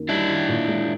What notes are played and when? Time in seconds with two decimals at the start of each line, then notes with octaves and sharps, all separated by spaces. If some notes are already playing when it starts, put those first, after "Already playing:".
Already playing: F#2 D#3 A#3
0.09 G3 D4 E4
0.29 D#3
0.49 A#2
0.68 G#3